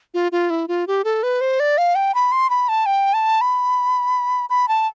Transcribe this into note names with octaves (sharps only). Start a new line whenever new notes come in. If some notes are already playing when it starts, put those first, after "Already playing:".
F4
F4
E4
F4
G4
A4
B4
C5
D5
F5
G5
B5
C6
B5
A5
G5
A5
B5
B5
A5